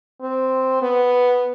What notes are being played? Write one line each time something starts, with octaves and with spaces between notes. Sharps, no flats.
C4
B3